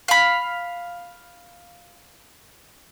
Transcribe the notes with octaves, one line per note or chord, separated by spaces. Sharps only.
F5 B5